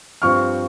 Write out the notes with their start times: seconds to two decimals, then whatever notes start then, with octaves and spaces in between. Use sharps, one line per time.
0.22 G2 F3 C4 C#6 F6